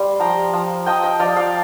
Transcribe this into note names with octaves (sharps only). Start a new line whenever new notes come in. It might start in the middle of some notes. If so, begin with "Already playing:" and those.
Already playing: G3 C6
F3 G5 A#5
F3
F3 D#5 G5
D#5 G5
F3 D5 F5
D5 F5